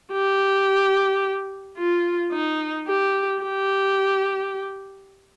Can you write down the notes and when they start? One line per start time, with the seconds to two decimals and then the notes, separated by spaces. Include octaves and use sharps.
0.12 G4
1.78 F4
2.32 D#4
2.88 G4
3.43 G4